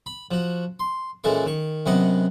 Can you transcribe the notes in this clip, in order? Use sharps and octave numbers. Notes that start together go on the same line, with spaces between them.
B5
F3 F#4
C6
A#2 E3 G#3 C#4 A4 C#6
D#3 C#6
F#2 C3 B3 D#5 F#5